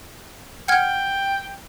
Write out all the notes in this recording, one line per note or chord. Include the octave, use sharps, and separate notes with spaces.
F#5 G5 F6 G#6